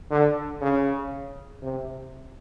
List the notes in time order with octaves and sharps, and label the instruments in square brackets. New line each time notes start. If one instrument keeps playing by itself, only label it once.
[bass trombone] D3
C#3
C3